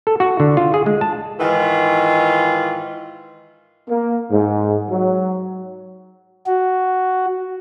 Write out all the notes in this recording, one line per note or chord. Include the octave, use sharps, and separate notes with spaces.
A4
F#4
D3
F4
G#4
G#3
A5
G#2 D#3 E3 F4
A#3
G#2
F#3
F#4